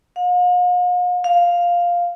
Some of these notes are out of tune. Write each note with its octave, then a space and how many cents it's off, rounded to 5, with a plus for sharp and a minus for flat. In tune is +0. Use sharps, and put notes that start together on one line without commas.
F5 +45
F5 +0